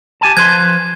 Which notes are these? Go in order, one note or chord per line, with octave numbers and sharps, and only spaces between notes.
G4 G#5 A5
F3 B4 C6 G#6